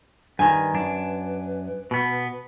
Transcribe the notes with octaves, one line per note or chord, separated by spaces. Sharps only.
G2 D#3 B4 G#5
F#2 D4
B2 B3